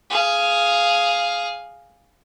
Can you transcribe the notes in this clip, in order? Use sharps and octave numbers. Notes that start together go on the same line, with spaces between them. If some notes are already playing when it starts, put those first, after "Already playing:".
G#4 F5